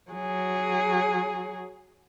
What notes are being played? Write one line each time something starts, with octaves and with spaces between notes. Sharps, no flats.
F#3 G#4